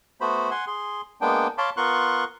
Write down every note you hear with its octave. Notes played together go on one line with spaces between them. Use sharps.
A3 B3 F#4 C5 B5
F#5 G#5 C6
G#4 C6
G#3 A#3 B3 D4 G5
C#5 F5 A5 B5 C6 D6
B3 F4 A#4 C6 C#6 F#6